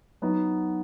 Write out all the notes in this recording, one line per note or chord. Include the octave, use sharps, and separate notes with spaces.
F#3 B3 D#4 F#4